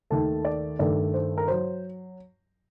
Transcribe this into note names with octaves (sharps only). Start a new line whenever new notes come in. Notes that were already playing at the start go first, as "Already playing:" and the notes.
D#2 D#3 A3 A5
D5
G2 D#3 A3 D5
C5
A#4
F#3 C5